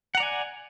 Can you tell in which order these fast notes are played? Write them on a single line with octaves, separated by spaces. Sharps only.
F#5 A#5 D5 G#5